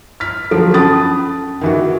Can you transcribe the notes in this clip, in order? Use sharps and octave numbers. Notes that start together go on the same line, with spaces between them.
F6 B6
D3 F3 F#3 A4
C#4 A5 B5 D#6 A6
D#3 E3 F#4